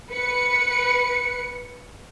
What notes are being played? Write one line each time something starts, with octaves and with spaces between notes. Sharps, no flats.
B4 C#7